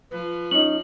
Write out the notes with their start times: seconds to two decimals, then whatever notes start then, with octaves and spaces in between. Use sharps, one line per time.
0.11 F3 B4
0.51 C#4 D#4 F#7